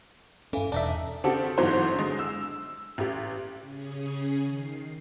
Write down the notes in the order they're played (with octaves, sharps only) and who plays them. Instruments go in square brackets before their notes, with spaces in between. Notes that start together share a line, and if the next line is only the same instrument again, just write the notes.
[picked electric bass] G2 C#4 [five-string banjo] E3 [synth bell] A4 F5
[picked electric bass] E1 [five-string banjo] D4 D#4 E5
[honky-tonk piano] C#3 C4 D4 F#4 G4 A4
G1 G#2 E3 F#3 C4 C5
D3 G#3
E6
A1 G4
[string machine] C#3 C#4 G#4
D#3 C7